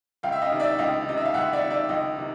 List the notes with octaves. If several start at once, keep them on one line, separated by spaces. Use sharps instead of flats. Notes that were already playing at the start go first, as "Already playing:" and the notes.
C#2 F5 G5
E5
D#5 F5
C3 D#3
D5 E5
C#2 D#5 F5
C3 D#3 D#5
E5
F5
C#2 E5 F#5
D5 E5
C3 D#3
D5 E5
C#2 D#5 F5
C3 D#3